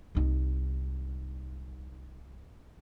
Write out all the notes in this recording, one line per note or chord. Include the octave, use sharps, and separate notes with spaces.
C2 D#4